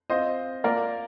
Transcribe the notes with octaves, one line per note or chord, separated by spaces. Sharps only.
C4 F4 C5 D#5
A#3 F4 A#4 D5